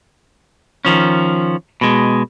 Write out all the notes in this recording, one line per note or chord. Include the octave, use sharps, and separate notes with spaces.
D#3 F3 C#4
B2 G#3